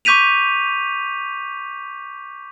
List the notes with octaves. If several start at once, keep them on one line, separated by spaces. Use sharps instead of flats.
C#6 D6 G6 B6 D#7 F7